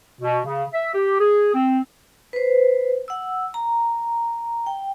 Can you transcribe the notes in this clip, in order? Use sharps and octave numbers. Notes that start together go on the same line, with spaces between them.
B2
C#3
E5
G4
G#4
C4
B4 C5
F#5 E6
A#5
G5